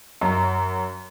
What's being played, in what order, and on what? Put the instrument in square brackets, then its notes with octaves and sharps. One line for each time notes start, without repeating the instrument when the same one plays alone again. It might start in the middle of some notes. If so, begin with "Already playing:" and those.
[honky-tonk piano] F#2